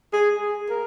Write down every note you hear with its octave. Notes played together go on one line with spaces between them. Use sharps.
G#4
A#4